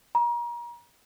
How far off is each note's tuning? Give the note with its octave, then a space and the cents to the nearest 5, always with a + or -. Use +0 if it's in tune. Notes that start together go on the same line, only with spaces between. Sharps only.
A#5 +35